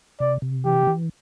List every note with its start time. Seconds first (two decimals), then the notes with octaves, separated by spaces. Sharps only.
0.20 C3 D5
0.42 C3
0.65 E3 G4
0.87 E3